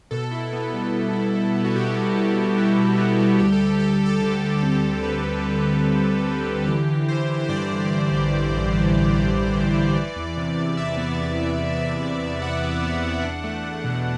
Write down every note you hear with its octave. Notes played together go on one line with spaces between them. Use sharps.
B2 A4
E4
B3
G3
B2
E4
E4
B3
F#4
B2 G4
G3
B3
B2
E4
B2
B3
G3
D2 G4
A4
D2
G4
G3 A4
G4
D2
A4
D3 G4
A4
D3 G4
C4 A4
G4
G3
G3 B4
D2
G3
G3
D2
D3
G3
D3
E3 G4
E3
E3 C5
E3
C5
G2 D5
G2
G2
A1
G2
A1
E3
A1
E3
G2
E3
E3
E3
E2
C3
C3
C3 E5
B3
B3
C3
E3
C3
C3
E2
E3 F#5
B3
B3
E2
D4
A3
A3
B2